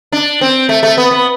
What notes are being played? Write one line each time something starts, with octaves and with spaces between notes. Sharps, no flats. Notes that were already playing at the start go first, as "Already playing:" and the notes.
D4
C4
A3
A3
B3
B3